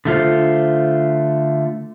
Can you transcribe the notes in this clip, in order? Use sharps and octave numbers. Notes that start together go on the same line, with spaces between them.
D3 A3 F4 C5